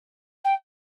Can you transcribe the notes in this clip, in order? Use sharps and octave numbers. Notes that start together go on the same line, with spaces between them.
G5